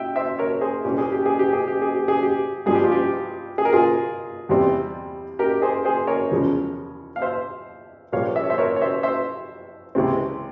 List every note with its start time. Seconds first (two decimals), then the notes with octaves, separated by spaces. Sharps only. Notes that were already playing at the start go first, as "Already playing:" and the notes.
Already playing: E5 G5
0.16 C5 E5
0.39 A#4 C#5
0.61 G#4 C5
0.84 C2 A#2 G3 C#4 G4
0.98 G#4
1.12 G4
1.26 G#4
1.39 G4
1.53 G#4
1.68 G4
1.82 G#4
1.95 G4
2.08 G#4
2.23 G4
2.66 G2 F3 G#3 G#4
2.75 G4
2.84 F4
2.92 G4
3.58 G#4
3.65 A#4
3.73 F4 G#4
4.49 E2 C3 G3 C4
5.39 G4 A#4
5.62 G#4 C5
5.85 G#4 C5
6.07 A#4 C#5
6.31 E2 C#3 F3 G#3 C#4
7.16 F5
7.22 C5 E5
8.12 A#1 A#2 G3 C#5 F5
8.36 E5
8.43 C#5
8.50 C5 E5
8.58 A#4 C#5
8.76 C#5
8.81 C5 E5
9.03 C5 E5
9.95 C#2 C3 E3 G#3 C4